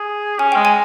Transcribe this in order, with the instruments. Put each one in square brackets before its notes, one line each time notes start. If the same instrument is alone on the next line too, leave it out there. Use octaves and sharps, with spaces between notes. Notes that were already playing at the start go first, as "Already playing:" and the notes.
Already playing: [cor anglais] G#4
[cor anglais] C#4 [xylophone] G#5
[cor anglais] G#3 [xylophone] G5
[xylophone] G#5